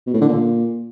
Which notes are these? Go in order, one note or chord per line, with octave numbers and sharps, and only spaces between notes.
B2
A2
D3
A#2